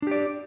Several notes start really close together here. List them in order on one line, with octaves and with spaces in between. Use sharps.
D4 G4 D5